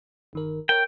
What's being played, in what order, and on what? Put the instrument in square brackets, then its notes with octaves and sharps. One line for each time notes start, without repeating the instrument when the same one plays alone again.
[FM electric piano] G1 D#3 A#4
[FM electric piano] A#4 C#5 [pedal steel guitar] G5